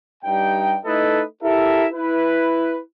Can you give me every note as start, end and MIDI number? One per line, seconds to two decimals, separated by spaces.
0.23 0.76 43
0.23 0.76 55
0.23 0.76 63
0.23 0.76 79
0.84 1.22 57
0.84 1.22 63
0.84 1.22 64
0.84 1.22 69
0.84 1.22 71
0.84 1.22 75
1.43 1.87 64
1.43 1.87 67
1.43 1.87 69
1.43 1.87 70
1.43 1.87 76
1.93 2.78 64
1.93 2.78 71